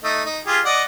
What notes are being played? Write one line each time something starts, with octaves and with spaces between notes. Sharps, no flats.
A3 D#4
D#4
F4 G4 G#4
D5 D#5 F#5